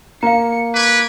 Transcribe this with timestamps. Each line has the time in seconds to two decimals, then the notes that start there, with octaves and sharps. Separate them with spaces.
0.23 A#3 F5 A#5 C#7
0.75 B4 D6 G#6